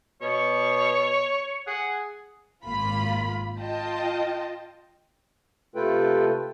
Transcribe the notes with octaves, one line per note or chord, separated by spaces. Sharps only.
B2 C#5
G#4 F#5
G#1 A#3 F4 B5
F4 D#5 G5 A5
C3 A3 F4 A4 B4 G5